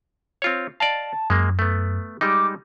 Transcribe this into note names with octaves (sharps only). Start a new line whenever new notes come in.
C4 F4 C#5
D5 D#5 F5 A5
F#2 G#3 A#3
A3 B3
G3 G#3 D#4 D6